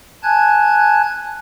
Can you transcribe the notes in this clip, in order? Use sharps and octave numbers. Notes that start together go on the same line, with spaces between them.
G#5 A5 F#6 G#6